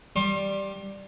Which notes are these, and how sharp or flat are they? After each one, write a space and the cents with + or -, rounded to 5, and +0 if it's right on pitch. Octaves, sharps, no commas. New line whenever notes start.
G3 +0 C6 +30